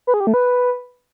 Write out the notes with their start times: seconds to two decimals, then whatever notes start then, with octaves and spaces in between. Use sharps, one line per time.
0.07 B4
0.14 G#4
0.20 G4
0.27 A3
0.34 B4